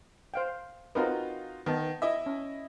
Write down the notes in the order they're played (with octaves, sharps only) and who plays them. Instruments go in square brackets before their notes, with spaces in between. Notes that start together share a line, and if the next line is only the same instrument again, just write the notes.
[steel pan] C5 F5 G5
[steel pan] C4 A#4 B4 [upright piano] D#4 F4 F#4
[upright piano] D#3 [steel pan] B3 A5
[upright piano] E4 D#5 E5
[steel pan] C#4